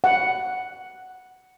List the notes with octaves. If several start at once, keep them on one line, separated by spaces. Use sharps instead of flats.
F#5